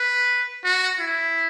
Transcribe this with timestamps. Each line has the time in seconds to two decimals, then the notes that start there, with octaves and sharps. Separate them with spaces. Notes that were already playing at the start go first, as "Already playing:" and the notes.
Already playing: B4
0.64 F#4
1.00 E4